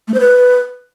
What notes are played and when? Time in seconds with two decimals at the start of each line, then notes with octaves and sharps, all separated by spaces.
0.08 A3
0.14 C5
0.20 B4